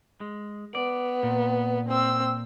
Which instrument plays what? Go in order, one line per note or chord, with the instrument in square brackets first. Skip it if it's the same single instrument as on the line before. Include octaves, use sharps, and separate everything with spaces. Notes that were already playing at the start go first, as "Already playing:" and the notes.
[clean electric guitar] G#3
[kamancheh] B3 [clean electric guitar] D5
[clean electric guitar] A#2
[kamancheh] C4 E6